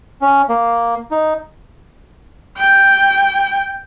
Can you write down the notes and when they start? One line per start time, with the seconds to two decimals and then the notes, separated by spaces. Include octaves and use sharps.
0.22 C#4
0.49 A#3
1.11 D#4
2.58 G5